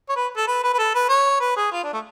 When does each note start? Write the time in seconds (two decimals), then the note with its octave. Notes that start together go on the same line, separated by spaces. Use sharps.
0.09 C#5
0.16 B4
0.37 A4
0.47 B4
0.64 B4
0.74 B4
0.79 A4
0.95 B4
1.09 C#5
1.41 B4
1.57 G#4
1.72 F4
1.83 D4
1.93 A3